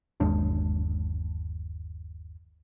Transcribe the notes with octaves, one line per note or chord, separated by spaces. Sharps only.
G1 D#2 G#3 D4